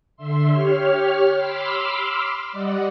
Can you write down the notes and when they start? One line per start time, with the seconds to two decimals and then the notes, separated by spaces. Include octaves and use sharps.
0.17 D3 E5 C6
0.50 G4 C#5 F6
1.35 B5 C6 D6 E6 F6
2.52 G3 D5 D#5 F#5